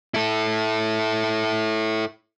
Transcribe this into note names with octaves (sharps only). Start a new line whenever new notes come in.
E4 A4